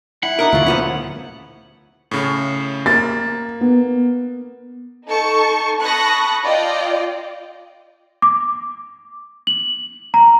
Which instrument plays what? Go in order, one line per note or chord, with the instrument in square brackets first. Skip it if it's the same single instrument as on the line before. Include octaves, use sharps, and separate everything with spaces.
[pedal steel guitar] E4 [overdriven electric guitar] F#5
[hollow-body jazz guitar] D4 D#4 A#4
[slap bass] D2 A#2 C#3 [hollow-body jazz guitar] F#3 F4
[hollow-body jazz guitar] F3 B3 C#4
[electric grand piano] A2 C#3
[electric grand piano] A#3 [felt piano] A6
[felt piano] B3
[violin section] D#4 A4 A5 C#6
A5 B5 C#6 D#6 F#6 A#6
F4 D5 D#5 G5
[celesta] D6
F#7
A#5